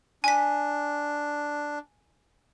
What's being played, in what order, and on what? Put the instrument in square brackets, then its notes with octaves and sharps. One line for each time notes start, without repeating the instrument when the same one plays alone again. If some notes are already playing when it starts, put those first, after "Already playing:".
[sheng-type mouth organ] D4 [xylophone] G#5 B6